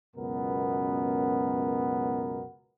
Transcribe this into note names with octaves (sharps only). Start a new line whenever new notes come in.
C#2 F#2 B2 B3 A#4